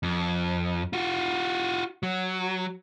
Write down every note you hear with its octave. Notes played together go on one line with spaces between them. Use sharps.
F2
F4 F#4
F#3